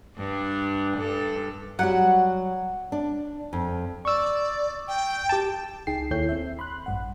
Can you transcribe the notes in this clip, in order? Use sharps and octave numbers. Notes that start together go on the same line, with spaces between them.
G2 D4
G2 A4
F#3 G3 F#4 F#5
D4
F2
D5 C#6 E6
G5
G4 A5
C#2 D#4 G#4 G5 C7
D#2 E4 A4 C#5 G6 C7
C4 E5
B5 C6 F#6
A1 G2 F#5